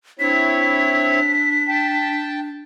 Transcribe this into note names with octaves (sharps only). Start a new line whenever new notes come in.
C4 D4 E4 C#5 B6
G5 A5